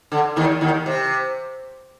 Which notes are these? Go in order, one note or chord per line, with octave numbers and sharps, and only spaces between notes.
D3
D#2 D#3
D#2 D#3
C3